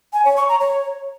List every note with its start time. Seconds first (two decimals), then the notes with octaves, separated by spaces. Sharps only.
0.13 G#5
0.25 C#5
0.37 C#6
0.49 A#5
0.60 C#5